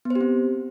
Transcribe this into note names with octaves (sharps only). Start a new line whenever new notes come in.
B3
C5
G4
C4